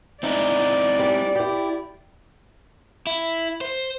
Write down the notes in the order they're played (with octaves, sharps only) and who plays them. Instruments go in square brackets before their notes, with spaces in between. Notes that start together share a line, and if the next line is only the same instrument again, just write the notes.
[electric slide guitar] C4 D#4 E4 [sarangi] D5
[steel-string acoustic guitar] G3
E4 G4
[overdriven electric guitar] E4
C5